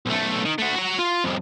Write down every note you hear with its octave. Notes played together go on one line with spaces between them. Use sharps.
B1 A3
D#3
A3 F#4
F#4 A#5
F4
C2 F2